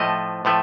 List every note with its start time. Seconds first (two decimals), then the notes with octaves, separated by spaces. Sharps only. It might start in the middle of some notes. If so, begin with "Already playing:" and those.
Already playing: A2 F3 A3 D#5
0.45 A2 F3 A3